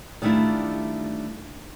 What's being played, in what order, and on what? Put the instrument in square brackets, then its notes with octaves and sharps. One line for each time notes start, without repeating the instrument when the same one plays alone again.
[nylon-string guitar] D#3 G3 A3 D4 E4 F4